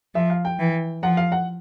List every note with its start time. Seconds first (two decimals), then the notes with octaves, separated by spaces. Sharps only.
0.15 F3 E5
0.30 F5
0.45 G5
0.59 E3
1.03 F3 F#5
1.17 F5
1.32 F#5